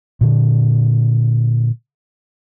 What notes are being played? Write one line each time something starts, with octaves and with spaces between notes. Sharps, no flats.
A#2 D3